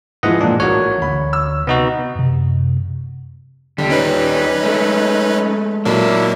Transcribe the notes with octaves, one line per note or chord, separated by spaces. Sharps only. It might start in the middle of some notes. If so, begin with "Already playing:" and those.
G#2 E3 F3 G#3 D#5 F#5
A#2 D4
A1 E3 F#4 A#4 C#5
D2 D3 G#3 B5
E6
C3 B3 D#4 F#4
F#2 C3
D#2 D3 G3
C#4 D#4 B4
G#3 A3
A#2 F#3 A#3 D4 E4